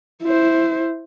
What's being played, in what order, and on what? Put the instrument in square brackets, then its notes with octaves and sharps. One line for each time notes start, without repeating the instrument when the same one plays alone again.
[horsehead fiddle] E4 C5